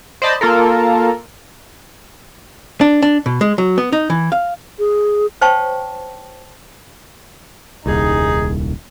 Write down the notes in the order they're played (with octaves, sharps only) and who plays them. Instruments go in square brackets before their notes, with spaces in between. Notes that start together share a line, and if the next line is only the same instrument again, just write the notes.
[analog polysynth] C5 D5 D#5 A5 B5
A#3 F4 A4 A#4
[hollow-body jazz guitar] D4
D4
B2
G#3
F#3
B3
D#4
E3
F5
[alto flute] G#4
[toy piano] C5 C#5 F5 G5 A5 C#6
[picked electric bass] D#1 C2 [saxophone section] D#4 G#4